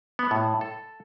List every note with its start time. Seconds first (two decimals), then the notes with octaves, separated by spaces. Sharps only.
0.19 B3
0.31 A2
0.61 A4